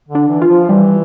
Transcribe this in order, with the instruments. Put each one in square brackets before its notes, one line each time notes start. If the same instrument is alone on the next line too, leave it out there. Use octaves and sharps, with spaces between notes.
[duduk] D3
[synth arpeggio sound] D4
[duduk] E3
[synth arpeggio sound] F4
[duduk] F3
[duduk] E3 [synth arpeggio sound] G3